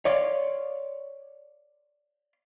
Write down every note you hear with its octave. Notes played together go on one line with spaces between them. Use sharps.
C#5 D5 F5 C6